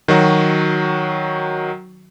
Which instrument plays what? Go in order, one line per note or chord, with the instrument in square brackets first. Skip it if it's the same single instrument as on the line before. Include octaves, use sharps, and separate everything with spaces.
[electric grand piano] D#3 F#3 F#4